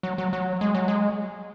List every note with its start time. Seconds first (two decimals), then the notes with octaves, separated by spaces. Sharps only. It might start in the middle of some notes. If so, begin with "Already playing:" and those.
0.03 F#3
0.18 F#3
0.33 F#3
0.61 G#3
0.75 F#3
0.88 G#3